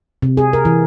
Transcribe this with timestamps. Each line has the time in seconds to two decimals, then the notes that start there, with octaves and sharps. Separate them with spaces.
0.22 C3
0.37 G#4
0.53 A#4
0.65 E3